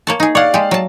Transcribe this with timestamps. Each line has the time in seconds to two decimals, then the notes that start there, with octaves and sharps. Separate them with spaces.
0.07 A#3 C#5 A5
0.20 D#4 G#4
0.35 C#5 D5 F5 F#5
0.54 G#3 G4
0.71 F#3 A5